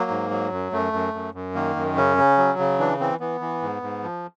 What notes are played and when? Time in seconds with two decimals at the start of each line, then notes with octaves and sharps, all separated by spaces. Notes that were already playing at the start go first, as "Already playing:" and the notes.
Already playing: F#3 A#3
0.10 G#2
0.31 F#3
0.52 F#2
0.72 F#2 A3
0.93 F#2
1.14 F#2
1.34 F#2
1.55 D#3 A#3
1.76 F#2
1.96 C#3 C#4
2.17 C#3
2.38 F#3
2.59 C#3
2.79 E3 D4
3.00 E3 C4
3.20 E3 B3
3.41 E3
3.62 G#2
3.82 G#2
4.03 F3